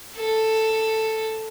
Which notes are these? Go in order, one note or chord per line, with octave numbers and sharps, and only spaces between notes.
A4